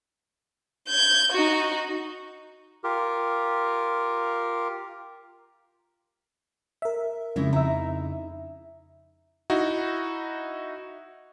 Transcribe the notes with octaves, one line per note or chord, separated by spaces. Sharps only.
G6 G#6
D#4 F#4
F4 G4 A#4
A#4 E5
F2 C#3 G#3 D#4 E4
D#4 E4 E5 A#5
D#4 E4 F#4